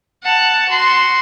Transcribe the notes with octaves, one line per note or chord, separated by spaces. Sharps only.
F#5 A5
F#4 C6